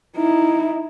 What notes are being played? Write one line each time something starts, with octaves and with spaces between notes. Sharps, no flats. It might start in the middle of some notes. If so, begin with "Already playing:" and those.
D#4 E4